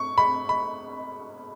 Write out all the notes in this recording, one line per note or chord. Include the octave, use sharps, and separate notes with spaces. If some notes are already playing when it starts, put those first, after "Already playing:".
Already playing: C#6
B5
B5